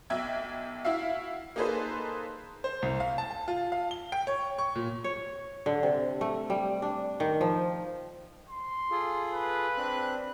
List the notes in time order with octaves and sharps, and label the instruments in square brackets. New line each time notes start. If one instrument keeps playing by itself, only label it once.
[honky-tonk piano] B1 E5 G5 G#6
E4 F#4 E5 F5
A#3 D#4 G#4 A4 B4 C5
[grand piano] C5
C2
F5
A5
A5
F4
F5
G7
G5
C#5
C#6
A#2
[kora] C#5
D3
C3
A3
G3
D4
D#3
F3
[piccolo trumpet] C6
[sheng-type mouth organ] F4 G#4 A4
[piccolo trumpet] B4
[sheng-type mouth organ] C4 D4 F#6